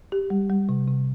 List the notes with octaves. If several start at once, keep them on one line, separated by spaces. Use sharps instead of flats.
G4
G3
G3
C3
C3